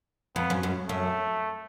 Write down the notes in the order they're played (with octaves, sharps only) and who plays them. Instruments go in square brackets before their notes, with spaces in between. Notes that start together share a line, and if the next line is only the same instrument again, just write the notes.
[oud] F2 [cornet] B3
[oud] F#2
F#2
[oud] F#2 [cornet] A3